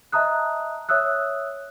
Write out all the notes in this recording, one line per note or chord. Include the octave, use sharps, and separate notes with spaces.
D#5 E5 A5 A#5 D#6 F#6
C#5 E5 D#6 E6 F#6